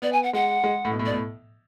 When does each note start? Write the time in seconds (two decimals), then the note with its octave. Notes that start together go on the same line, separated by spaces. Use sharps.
0.02 B3 D5
0.12 G#5
0.23 F#5
0.33 G#3 F#5
0.64 G#3
0.85 A2
0.91 B2
0.99 A2
1.05 B2 D5
1.13 A2